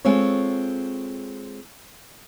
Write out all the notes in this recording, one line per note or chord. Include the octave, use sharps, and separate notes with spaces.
G#3 C4 F4 A4 C#5